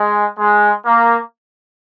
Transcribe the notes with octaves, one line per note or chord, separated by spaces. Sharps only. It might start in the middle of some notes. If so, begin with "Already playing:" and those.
Already playing: G#3
G#3
A#3